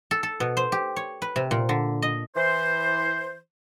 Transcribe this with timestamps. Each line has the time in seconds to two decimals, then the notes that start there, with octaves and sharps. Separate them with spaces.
0.11 A4
0.23 A4
0.40 B2
0.57 C5
0.72 G4
0.96 C#5
1.22 B4
1.36 C3
1.51 A#2
1.69 D3
2.02 D#5
2.36 E3 C5